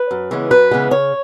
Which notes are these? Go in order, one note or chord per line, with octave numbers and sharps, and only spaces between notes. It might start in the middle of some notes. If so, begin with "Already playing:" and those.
Already playing: B4
F#2
C#3 E3 G#3 B3
F#2 B4
C#3 E3 G#3 B3
C#3 C#5